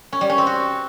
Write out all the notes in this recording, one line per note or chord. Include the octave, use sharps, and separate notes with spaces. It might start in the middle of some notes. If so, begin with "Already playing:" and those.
C#4
G3
C#4
C4
F#4